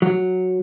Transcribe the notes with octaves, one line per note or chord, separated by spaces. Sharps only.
F#3